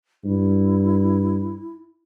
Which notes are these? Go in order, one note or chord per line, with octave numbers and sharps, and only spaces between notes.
G2 E4